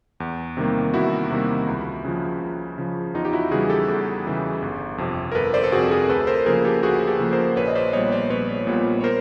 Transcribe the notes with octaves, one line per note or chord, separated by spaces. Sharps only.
E2
C3 D#3 G3 A#3
E2 E4 F#4
C3 D#3 G3 A#3
C#2
C#3 F3
C#2
C#3 F3
E2 D#4 F4
G4
E4 F#4
C#3 E3 G3 F#4 G#4
G4 A4
E2
C#3 E3 G3
G1
F2 C3
A#4
G1 A4 B4
C5 D5
A4
F2 C3 F#4 G#4
G#4 A#4
D2 A4 B4
A#4 C5
C#3 F3 A#3 G#4 A#4
G4 A4
D2 F#4 G#4
G4 A4
C#3 F3 A#3
A#4 C5
A#1 B4 C#5
D#5
C5 D5
A#2 G3 B3 C#5 D#5
C5 D5
A#1 B4 C#5
A#2 G3 B3
C#5
A#4 C5